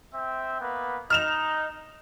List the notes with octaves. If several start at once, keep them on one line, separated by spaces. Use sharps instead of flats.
C4 E5 G5
A#3 B3 B4
D#4 F6 E7 F7